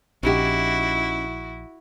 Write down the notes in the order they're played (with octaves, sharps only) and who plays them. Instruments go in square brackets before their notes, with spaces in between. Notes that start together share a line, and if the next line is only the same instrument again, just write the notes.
[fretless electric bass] A#1 [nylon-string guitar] C#4 D#4 G4 [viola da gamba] E4 F#4